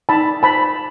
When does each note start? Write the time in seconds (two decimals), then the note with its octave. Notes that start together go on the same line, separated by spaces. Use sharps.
0.09 D#4 A5 B5
0.43 C5 A5 B5